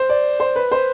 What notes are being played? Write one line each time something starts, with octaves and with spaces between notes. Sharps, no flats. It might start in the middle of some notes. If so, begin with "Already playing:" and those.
Already playing: C5
D5
C5
B4
C5